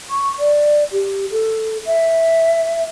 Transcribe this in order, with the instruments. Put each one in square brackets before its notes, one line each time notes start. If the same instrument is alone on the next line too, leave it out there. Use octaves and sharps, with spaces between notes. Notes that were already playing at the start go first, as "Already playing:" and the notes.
[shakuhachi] C#6
D5
G4
A4
E5